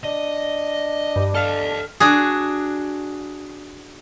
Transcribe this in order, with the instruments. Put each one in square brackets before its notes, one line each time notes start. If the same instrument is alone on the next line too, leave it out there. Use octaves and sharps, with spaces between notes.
[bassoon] D4 [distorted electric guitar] D#5
[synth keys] G2
[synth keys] A4 F6 [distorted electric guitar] D#5 F5
[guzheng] D4 F#4 G#4